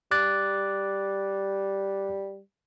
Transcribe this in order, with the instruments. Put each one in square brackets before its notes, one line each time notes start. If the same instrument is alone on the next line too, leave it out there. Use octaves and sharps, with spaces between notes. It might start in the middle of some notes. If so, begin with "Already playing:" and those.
[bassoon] G3 [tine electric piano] D6 F#6 A6